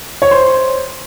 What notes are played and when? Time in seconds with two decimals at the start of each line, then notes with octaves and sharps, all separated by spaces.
0.22 C#5
0.31 C5